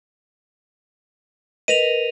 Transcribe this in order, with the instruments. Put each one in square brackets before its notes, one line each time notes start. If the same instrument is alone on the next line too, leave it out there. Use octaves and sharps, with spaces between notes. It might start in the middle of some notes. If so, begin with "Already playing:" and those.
[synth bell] A#4 B4 D#5 [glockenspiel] D#7 F7